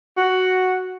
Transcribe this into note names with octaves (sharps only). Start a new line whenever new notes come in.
F#4